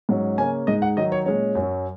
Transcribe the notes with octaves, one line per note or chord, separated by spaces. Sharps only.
G#2 F#3 C#4
C#3 A#3 C#4 G#5
G#2 G#3 D#4 D#5
F#5
D#3 F#3 D#4 D#5
C#5
A#2 G#3 C#4 C#5
F#2 F#3 C#4